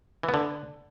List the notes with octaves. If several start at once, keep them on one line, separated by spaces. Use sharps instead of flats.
E3
B3
D3